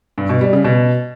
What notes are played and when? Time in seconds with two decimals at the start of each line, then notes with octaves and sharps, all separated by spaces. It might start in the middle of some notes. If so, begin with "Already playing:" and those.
0.18 G2
0.29 B2
0.41 G3
0.53 C#3
0.64 B2